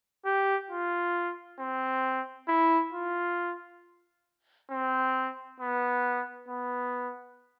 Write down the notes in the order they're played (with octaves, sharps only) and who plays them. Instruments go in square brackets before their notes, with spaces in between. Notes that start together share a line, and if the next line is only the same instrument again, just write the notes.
[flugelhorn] G4
F4
C4
E4
F4
C4
B3
B3